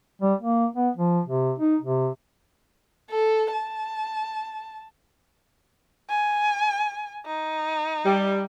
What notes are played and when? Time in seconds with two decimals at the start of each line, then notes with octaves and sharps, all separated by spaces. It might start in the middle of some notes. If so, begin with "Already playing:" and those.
0.22 G3
0.42 A#3
0.76 B3
0.97 F3
1.25 C3
1.58 D#4
1.81 C3
3.10 A4
3.52 A5
6.09 G#5
7.26 D#4
8.05 G3